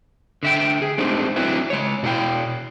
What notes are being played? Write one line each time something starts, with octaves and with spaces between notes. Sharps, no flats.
D3 E5 G5
G#4
G#3 A3 C4 D4 D#4 G4
F#3 C4 D4 E4 B4 E5
G#3 C#5
B2 D4 E4 G#4 F5 G5